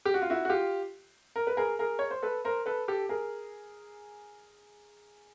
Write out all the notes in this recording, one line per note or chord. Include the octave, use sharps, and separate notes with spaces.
G4
F#4
F4
E4 F#4
F#4
F4 G4
A#4
B4
G#4 A#4
G#4 A#4
C#5
C5
A4 B4
A#4 C5
A4 B4
G4 A4
G#4 A#4